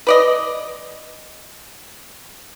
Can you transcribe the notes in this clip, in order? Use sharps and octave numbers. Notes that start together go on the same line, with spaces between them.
B4 D5 D#5